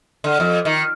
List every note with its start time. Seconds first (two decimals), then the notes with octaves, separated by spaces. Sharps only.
0.24 D3
0.40 F2
0.65 D#3